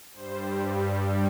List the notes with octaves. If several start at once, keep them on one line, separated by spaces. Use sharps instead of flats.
G2 G3 C5